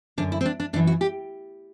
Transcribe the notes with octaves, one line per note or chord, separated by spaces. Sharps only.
F#2 D3 D4
E4
C4
D4
D4
F#2 E3 D4
F#4
G4